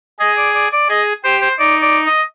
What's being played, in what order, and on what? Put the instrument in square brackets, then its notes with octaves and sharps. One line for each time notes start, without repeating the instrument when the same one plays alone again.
[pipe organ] G#4 [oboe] D#5
[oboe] D5
D5
D5
[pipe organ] G#4 [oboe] D#5
[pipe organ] G4 [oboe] C5
[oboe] C5
[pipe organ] D#4 [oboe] D5
[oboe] D5
D#5